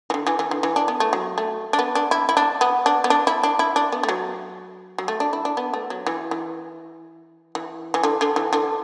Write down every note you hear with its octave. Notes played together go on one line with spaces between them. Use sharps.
E3
D3
E3
E3
D3
E3
D4
B3
A3
F#3
A3
D4
B3
D4
E4
E4
D4
B3
D4
B3
D4
E4
D4
E4
D4
B3
A3
F#3
F#3
A3
D4
E4
D4
B3
A3
F#3
E3
E3
E3
E3
D3
D3
E3
D3